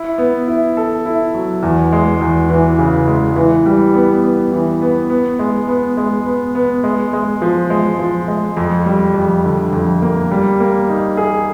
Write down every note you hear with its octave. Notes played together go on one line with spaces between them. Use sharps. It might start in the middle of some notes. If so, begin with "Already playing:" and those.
Already playing: E4
B3
E4
A4
E4
F#3
E2
G#3
E2
E3
C#3
G#3
E3
G3
B3
B3
E3
B3
B3
G#3
B3
G#3
B3
B3
G#3
G#3
F3
G#3
F3
G#3
F2
G3
F2
D3
F2
A#3
G3
A#3
D#4
G#4